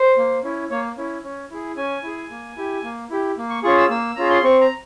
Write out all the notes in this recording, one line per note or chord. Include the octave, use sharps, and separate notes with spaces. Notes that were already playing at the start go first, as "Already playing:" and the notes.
Already playing: C5
A#3
C#4 E4
A#3 C#5
C#4 E4
C#4
E4 G#4
C#4 G#5
E4 G#4
A#3
E4 G4
A#3
E4 G4
A#3
C#6
C#4 F4 G#4 C#6
E6
A#3 E6
C#4 F4 G#4 A#5
C6
C4 C#6
A#5